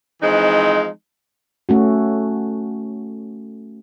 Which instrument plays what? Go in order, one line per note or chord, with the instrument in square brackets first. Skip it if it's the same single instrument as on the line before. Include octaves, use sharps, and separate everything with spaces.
[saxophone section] E3 F3 G#3 C4 D#4
[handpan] A3 C#4 F#4